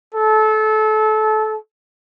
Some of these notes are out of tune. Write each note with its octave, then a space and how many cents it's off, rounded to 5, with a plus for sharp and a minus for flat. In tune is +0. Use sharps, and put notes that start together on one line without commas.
A4 -25